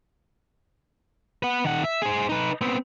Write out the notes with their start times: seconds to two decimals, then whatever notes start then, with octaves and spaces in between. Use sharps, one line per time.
1.43 B4 F#5
1.65 D#3 F#5
1.84 E5
2.02 G#4 C5
2.29 D#4 B4
2.61 B3 C4